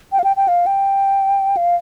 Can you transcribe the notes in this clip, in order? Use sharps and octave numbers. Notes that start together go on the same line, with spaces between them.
G5
F5
G5
G5
F5
G5
F5